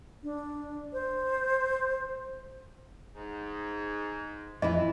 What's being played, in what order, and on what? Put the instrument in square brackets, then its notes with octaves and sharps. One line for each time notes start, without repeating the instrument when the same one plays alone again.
[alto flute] D4
C5
[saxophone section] G#2
[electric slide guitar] F2 [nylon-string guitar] E3 E4 [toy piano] D#5